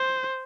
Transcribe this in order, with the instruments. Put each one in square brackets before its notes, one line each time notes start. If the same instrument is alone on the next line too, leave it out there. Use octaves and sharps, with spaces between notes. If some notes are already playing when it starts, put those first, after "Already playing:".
Already playing: [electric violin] C5